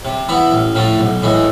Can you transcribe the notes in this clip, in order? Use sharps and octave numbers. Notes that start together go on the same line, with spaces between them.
C3
E3 B3 E4
A1
A2 F3 A3
B1
A2 E3 G#3